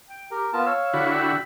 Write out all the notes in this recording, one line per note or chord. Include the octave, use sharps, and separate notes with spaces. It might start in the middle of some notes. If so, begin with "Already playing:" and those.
G5
G4 A#4
B3 F4 A#4 A5
C#5 F5 E6
D3 E4 F#4 B5
G5 E6